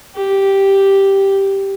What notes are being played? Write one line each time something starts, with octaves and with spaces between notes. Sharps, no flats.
G4